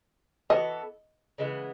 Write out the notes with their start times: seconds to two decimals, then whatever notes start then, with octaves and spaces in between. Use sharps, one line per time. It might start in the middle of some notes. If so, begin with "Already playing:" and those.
0.50 E3 B3 F#4 A4 D#5
1.38 C#3 E3 G#3 B3